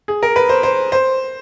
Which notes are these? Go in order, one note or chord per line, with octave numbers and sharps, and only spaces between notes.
G#4
A#4
B4
C5
C5
C5